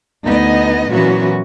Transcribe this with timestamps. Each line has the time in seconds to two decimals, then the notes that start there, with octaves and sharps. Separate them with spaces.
0.25 D2 B3 D#4 D#5
0.90 A#2 E3 F#3 B3 C#4 F#4